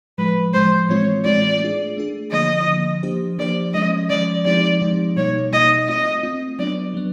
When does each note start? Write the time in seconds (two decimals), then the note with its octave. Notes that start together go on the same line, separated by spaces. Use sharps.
0.18 A2 F3 G#3 B4
0.54 A2 F3 G#3 C5
0.89 A2 E3 G#3 C4 F4 C#5
1.25 A2 E3 G#3 C4 F4 D5
1.60 A3 D4 F4 G#4
1.97 A3 D4 F4 G#4
2.32 D3 F3 A#3 D#5
2.68 D3 F3 A#3
3.03 F3 A#3 D4 G4 C5
3.38 F3 A#3 D4 G4 C5 D5
3.74 F3 G#3 C#4 D#5
4.10 F3 G#3 C#4 D5
4.45 F3 G#3 C4 D#4 G4 D5
4.81 F3 G#3 C4 D#4 G4
5.17 B2 G3 A#3 D#4 C#5
5.52 B2 G3 A#3 D#4 D#5
5.88 A3 C4 F4 D#5
6.23 A3 C4 F4
6.59 F#3 B3 D4 D5
6.94 F#3 B3